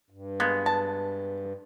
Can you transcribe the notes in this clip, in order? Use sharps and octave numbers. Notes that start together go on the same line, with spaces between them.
G2
G#3 A#3 B3
A5